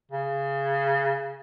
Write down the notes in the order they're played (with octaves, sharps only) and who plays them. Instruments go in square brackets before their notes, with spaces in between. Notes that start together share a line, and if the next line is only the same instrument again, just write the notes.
[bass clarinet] C#3